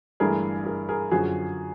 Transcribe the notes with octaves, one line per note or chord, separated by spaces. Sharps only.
G1 G2 E3 A3 G#4 A#4
G#4 A#4
G#4 A#4
F#2 D3 F3 F#4 G#4